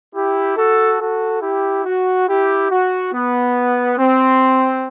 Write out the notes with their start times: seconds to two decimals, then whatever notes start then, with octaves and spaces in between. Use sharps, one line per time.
0.15 E4 G4
0.57 F#4 A4
1.00 F#4 A4
1.42 E4 G4
1.85 F#4
2.28 E4 G4
2.70 F#4
3.13 B3
3.98 C4